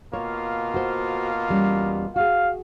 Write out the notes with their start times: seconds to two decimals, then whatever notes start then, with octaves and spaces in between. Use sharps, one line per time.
0.13 B2 A#3 F4 C#5
0.74 F#4 C5
1.49 E2 G3 C#4
2.16 F#4 G#4 F5